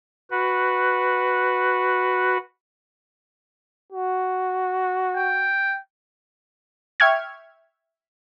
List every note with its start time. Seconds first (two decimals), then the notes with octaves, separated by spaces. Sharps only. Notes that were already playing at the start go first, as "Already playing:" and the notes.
0.31 F#4 B4
3.93 F#4
5.15 G5
7.00 E5 G5 C#6 F6 G#6